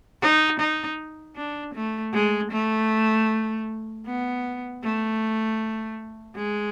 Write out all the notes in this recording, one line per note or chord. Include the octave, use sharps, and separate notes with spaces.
D#4
D#4
D4
A3
G#3
A3
B3
A3
G#3